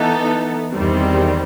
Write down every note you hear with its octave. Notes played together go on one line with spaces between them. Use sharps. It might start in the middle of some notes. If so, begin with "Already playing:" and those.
Already playing: E3 B3 D#4 A4
E2 D#3 G3 C4